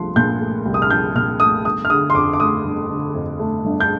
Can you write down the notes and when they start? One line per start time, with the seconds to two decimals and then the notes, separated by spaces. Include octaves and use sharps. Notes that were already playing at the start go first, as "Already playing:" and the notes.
Already playing: C2 F3 A3 C6
0.16 A#2 G6
0.41 A3
0.66 C2
0.74 D#6
0.82 F6
0.91 F3 G6
1.15 A#2 F6
1.40 A3 D#6
1.65 G1 D#6
1.85 F6
1.90 D3 D#6
2.10 C6
2.14 F2 D6
2.33 D6
2.40 A3 D#6
2.65 G1
2.90 D3
3.15 F2
3.39 A3
3.65 G1
3.80 G6